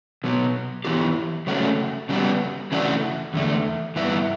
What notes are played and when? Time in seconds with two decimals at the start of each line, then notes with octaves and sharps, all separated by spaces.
0.24 B2 F#3 B3 F#4
0.85 E3 B3 E4 G4
1.47 C#3 F#3 A3 C#4 F#4
2.09 C#3 G3 B3 F#4
2.72 C#3 E3 A3 D4 F#4
3.34 E2 D3 A3
3.96 G2 E3 B3 E4